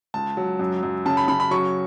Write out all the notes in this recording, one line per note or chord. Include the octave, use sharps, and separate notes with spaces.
C#2 A5
F#3
F#2
F#2
C#3 A5
B5
C#3 B5
B5
F#3 C#6